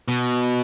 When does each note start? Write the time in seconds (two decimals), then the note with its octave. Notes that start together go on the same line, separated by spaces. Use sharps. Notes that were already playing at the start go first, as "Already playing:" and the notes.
0.08 B2